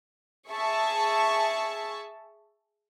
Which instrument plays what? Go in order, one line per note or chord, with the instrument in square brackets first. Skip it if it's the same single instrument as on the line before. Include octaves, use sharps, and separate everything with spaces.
[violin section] G#4 E5 A5 C#6